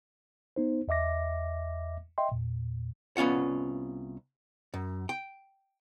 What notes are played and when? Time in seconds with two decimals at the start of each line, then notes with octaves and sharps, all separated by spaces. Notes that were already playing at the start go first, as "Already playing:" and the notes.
0.56 B3 D#4 C5
0.88 E2 D#5 E5 D6 A#6
2.18 D#5 E5 G5 C6
2.32 E2 A#2
3.17 C2 B3 C#4 F4 F#5
4.74 F#2
5.09 G5